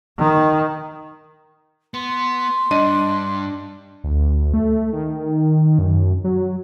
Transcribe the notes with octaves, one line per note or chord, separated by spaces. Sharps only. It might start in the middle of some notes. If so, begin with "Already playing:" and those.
D#3
B3 C6
G2 D4 D#5 D#7
D2
A3
D#3
F#2
F#3